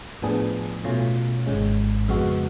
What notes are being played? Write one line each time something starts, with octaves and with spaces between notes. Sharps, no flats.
A2 F3 B3 D4 G#4
B2 A3 C#4 F4
G#1 G#2 G#3 C#4
F2 C#3 G#3 B3 F#4